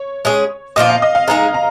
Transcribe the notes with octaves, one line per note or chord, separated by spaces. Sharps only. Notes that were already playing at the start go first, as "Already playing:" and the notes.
Already playing: C#5
G#3 C#4 G#4
A#2 F3 A#3 F4 D#5
F5
D#5
F5
G#3 D#4 G#4 A#5
A#5